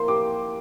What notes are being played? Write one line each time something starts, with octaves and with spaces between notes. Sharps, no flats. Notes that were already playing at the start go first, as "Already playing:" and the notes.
Already playing: A#3 E4 A#4 C5 C6
G4 D6